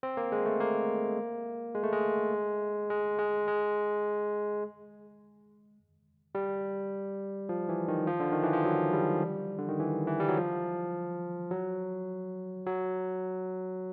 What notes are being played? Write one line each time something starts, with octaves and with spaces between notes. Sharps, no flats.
C4
A#3
G#3
A3
A#3
G#3
A3
G#3
G#3
G#3
G#3
G3
F3
E3
D#3
F3
D3
D#3
E3
F3
F#3
G3
D3
D#3
E3
E3
G3
F#3
F3
F#3
F#3